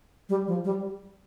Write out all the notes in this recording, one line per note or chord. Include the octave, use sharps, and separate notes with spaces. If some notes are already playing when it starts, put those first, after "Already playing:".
G3
F3
G3